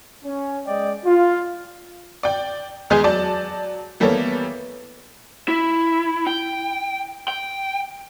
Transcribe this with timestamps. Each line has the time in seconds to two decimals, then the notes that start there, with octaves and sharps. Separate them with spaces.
0.24 C#4
0.66 G#3 D5 D#5 G5
1.04 F4
2.23 D5 G5
2.90 E2 G#3 G#4 G6
3.04 F#3 D5 A5
4.00 E3 G3 A#3 B3 A4 C#5
5.48 E4
6.27 G5
7.28 G5